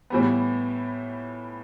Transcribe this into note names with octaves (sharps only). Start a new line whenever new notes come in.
A2 E3 G3 B3